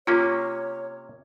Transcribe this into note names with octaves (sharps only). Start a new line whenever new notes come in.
C3 A#3 C#4 F4 C#5